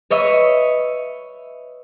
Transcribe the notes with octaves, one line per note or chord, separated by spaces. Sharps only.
B4 C#5 D#5 E5 C#6